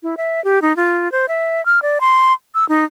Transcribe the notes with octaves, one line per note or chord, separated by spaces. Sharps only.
E4
E5
G4
D#4
F4
C5
E5
F6
D5
C6
E6
D#4